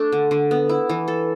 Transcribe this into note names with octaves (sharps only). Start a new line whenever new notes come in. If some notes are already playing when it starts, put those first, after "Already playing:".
Already playing: A3 D4
D3
D3
B3
E4
E3
A4